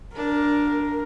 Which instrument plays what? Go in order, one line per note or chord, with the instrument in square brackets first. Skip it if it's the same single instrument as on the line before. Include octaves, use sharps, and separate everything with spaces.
[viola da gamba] D4 [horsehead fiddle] A#4